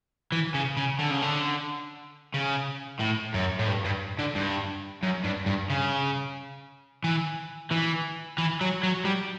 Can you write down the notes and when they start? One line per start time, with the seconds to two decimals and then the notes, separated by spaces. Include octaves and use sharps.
0.32 E3
0.54 C#3
0.77 C#3
0.99 D3
1.11 C#3
1.22 D3
2.34 C#3
3.00 A2
3.34 F#2
3.59 A2
3.67 G2
3.85 G2
4.19 D3
4.35 G2
5.03 F#2
5.24 G2
5.46 G2
5.70 C#3
7.04 E3
7.71 E3
8.38 E3
8.61 F#3
8.83 F#3
9.05 G3